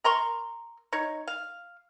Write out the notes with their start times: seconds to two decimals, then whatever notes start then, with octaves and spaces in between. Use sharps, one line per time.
0.04 A#4 A#5 C6 C#6
0.93 D#4 C#5
1.28 F5